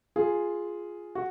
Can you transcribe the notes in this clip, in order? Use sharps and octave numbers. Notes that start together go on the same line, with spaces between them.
F4 G#4
F#4